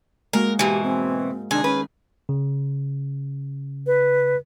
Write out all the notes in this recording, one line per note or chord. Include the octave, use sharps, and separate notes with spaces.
G#3 A#3 F#4 A#4
G#2 B2 E3 G4 G#5
C4
C3 D#3 D4 D#4 G#4
C#4 B4
C#3
B4